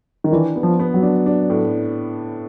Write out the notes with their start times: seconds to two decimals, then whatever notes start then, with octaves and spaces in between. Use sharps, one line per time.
0.24 D#3
0.32 E3 D4
0.56 B3
0.63 F3
0.79 B3
0.94 F#3
1.03 D4
1.26 D4
1.50 A2